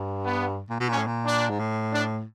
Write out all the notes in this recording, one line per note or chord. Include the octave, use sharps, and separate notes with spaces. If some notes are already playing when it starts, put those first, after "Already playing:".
Already playing: G2
B3
A#2
B2
A#2 C#4
A2
A#2
D4
G#2
A2
D4